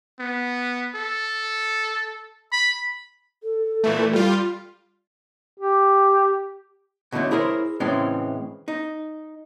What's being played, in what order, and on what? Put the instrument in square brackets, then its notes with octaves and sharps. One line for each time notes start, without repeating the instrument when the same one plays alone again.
[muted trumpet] B3
A4
B5
[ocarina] A4
[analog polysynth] A#2 E3 A3
G3 F4
[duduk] G4
[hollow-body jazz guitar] B2 D3 E3 A3 C#4
E4 G#4 A#4 C5 C#5
A2 C#3 E3 G#3 C4 C#4
D#4